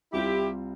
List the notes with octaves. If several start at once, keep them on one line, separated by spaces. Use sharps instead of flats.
C2 C3 G3 C4 E4 F4 G4